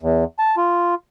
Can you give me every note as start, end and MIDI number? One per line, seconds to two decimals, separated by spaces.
0.02 0.24 40
0.39 0.55 81
0.57 0.95 65